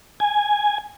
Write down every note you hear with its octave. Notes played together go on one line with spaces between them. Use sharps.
G#5